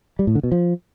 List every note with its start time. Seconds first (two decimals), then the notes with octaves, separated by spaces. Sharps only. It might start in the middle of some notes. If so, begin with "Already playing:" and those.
0.19 G3
0.27 A2
0.35 D3
0.43 B2
0.52 F3